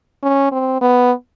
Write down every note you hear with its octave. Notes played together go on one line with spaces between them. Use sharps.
C#4
C4
B3